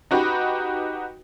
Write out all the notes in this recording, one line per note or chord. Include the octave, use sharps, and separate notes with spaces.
D#4 F#4 G4 B4